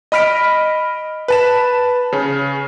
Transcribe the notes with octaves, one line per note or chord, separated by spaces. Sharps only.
D#5 B5 F6 B6 D7
B4 A5 E7
C#3 C#4